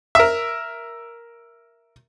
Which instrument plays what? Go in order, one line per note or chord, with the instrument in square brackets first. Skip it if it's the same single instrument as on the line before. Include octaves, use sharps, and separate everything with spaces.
[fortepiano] A#4 E5